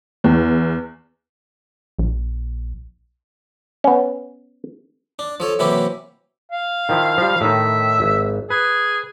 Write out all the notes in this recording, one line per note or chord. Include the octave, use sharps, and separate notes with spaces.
E2
A#1
B3 C#4
D4
F3 A4 C#5
C3 E3 F#3 A#3 E4 G4
F5
D#3 F3 E4
F3 G3
A2 D#3 D#4 E5
G#1
G#4 B4